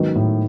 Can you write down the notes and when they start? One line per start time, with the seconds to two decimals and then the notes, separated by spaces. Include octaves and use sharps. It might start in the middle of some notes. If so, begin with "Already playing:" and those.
Already playing: G#2 D#3 F#3 B3 D#4
0.15 A2